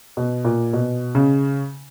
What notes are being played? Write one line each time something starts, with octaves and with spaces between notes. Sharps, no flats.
B2
A#2
B2
C#3